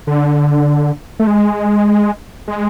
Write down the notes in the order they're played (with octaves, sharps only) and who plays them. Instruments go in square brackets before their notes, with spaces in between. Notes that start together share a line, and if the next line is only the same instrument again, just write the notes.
[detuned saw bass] D3
A3
G#3
G#3